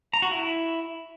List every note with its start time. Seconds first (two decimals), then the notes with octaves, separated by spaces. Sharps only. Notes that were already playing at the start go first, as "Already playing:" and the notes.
0.14 A#5
0.22 F#4
0.31 E4